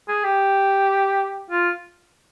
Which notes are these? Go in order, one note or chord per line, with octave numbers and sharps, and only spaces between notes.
G#4
G4
F4